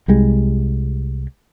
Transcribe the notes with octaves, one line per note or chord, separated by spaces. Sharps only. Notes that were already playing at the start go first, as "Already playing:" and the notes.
C2 G3 G#3